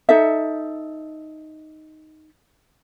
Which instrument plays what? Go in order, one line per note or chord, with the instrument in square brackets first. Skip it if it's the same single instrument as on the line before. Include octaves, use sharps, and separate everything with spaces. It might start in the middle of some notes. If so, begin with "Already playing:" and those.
[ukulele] D#4 A4 E5